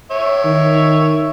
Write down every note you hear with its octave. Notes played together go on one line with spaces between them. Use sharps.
C#5 E5
D#3